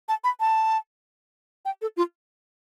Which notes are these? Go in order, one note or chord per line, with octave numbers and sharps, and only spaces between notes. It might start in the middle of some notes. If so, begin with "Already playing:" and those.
A5
B5
A5
G5
A4
F4